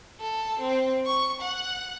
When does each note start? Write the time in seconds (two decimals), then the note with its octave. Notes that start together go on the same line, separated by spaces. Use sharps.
0.20 A4
0.59 C4
1.06 C#6
1.40 F#5